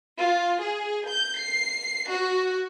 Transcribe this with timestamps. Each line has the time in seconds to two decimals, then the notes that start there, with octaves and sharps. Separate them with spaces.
0.20 F4
0.62 G#4
1.06 G6
1.39 C7
2.11 F#4